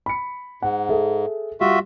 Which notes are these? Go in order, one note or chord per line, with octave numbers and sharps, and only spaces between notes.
B5 C#7
G#2 F#5
G#4 A4 E5
G3 F4 F#4 E5